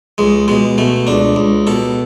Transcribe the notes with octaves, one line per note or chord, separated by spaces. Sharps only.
C#2 G#3
B2 G#3
B2 A3
C#2 D4
C#2
B2 A4